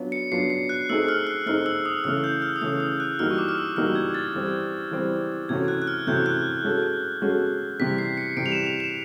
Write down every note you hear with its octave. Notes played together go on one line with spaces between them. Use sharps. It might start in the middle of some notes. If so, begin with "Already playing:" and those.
Already playing: F#3 B3 D4 F4
C#7
F#3 B3 D4 F4 C7
C7
F#6
A3 C4 D#4 G#4 E6
F6
F#6
A3 C4 D#4 G#4 F6
E6
D#6
C#3 E3 A3 F6
G6
F6
D#6
C#3 E3 A3 E6
D#6
F#6
E3 G3 A#3 D#4 F#4 F6
C#6
D6
F6
E6
E3 G3 A#3 D#4 F#4 F6
G#6
A6
E3 G3 C4
E3 G3 C4
C3 E3 A3 C#4 F#4 G#6
F#6
F#6
F6
C3 E3 A3 C#4 F#4 G6
F#6
G#3 C#4 F#4 A4
G#3 C#4 F#4 A4
C3 E3 G3 B6
C7
C#7
C3 E3 G3 D7
F7
E7
F7
E7